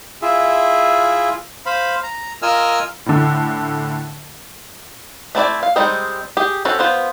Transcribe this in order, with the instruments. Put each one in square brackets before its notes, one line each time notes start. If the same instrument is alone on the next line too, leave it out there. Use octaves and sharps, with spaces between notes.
[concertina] E4 F4 G#4 E5
C5 F5 B5
A#5
F4 A#4 D#5 G#5 E6 F6
[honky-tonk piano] A2 D3
[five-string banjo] A3 C4 E4 D5
F5
G3 G#3 C4 D#4
G4 G#4
C4 C#4 F#4 A4
B3 F4 C5